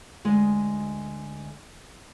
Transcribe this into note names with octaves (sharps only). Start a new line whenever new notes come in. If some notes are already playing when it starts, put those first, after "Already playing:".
D2 G#3 D#5